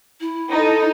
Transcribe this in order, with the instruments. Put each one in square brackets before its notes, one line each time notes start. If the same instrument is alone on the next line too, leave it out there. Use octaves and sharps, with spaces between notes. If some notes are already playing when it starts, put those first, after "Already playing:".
[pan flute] E4
[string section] D#4 A4